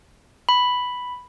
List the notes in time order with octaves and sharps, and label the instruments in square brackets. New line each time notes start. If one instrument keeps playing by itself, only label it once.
[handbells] B5